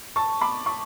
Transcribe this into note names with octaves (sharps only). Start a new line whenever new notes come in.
A5 C#6
B5 D6
A5 C#6